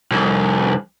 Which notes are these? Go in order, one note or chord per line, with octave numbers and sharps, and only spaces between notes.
C2 F2